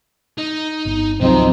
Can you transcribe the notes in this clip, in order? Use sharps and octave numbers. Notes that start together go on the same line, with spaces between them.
D#4
G1
G#1 C#2 C3 F3 F#3 C4 D#4